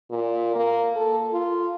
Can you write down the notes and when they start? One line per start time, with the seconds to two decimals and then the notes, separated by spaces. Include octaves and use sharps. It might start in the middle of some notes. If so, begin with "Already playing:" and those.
0.11 A#2
0.56 A#3
0.96 A4
1.33 F4